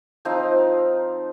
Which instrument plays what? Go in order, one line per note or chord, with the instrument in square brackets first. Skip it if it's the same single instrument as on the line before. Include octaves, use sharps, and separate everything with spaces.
[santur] F3 C4 D#4 F5